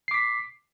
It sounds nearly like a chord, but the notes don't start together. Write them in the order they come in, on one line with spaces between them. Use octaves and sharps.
C7 D6 B6